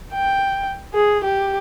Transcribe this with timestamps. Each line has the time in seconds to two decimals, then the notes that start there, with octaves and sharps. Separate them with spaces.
0.12 G5
0.94 G#4
1.24 G4